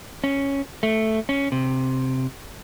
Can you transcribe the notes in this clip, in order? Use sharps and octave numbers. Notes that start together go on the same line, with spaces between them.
C#4
A3
C#4
C3